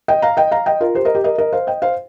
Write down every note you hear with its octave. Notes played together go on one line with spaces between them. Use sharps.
D#5 G5
F5 A#5
D#5 G5
F5 A#5
D#5 G5
F4 A#4
G4 C5
A#4 D#5
G4
A#4 D#5
A#4 D#5
C5 F5
D#5 G5
C5 F5